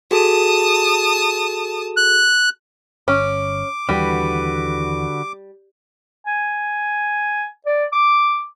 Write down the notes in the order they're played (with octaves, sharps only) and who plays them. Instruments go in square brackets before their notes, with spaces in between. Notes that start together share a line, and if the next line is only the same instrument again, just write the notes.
[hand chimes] F#4 G#4 A4 [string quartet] A5 D#6
[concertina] F#6
[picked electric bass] G1 [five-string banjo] C#4 [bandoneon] D6
[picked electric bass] D#2 E3 [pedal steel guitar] D3 F#4 B4 [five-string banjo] G3
[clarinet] G#5
D5
D6